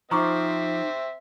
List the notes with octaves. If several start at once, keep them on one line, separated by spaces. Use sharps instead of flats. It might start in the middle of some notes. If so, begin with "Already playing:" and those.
F3 C4 D#4 E5 A#5 C#6 D6